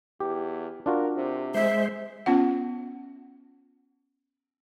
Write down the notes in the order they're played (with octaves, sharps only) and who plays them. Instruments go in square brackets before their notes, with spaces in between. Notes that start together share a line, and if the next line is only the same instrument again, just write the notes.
[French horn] E2 [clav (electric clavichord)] G4
[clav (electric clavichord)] D4 F4 F#4 [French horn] A#4
[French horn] C3
[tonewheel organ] G#3 C5 [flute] E5
[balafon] B3 C#4 F4 F#5